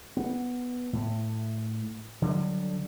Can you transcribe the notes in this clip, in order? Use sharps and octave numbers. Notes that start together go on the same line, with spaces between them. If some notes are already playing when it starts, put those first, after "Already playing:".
B3
A2
D3 F#3 G3